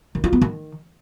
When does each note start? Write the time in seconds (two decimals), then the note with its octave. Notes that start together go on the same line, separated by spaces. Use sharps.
0.15 D#3
0.24 F4
0.33 B3
0.42 D#3